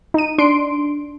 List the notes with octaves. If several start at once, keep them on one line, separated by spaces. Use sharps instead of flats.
D#4 D#7
D4 C6 D7